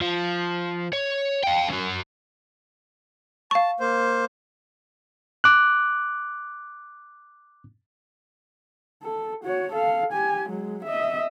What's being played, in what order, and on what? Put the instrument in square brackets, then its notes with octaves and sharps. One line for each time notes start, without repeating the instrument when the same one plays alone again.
[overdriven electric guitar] F3
C#5
F5 G5
C#4 F#4
[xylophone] F5 C#6 [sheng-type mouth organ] A5
[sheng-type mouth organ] A#3 C5
[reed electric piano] D6 F#6
[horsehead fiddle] A4
F#4 C#5
A4 F5
G4 G#5
F#3 G#3
D#5 E5